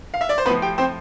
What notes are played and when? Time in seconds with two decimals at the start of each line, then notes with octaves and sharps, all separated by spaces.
0.14 F5
0.21 E5
0.29 D5
0.38 C5
0.46 A2 F3 B3 B4
0.62 G4 G5
0.78 C4 C5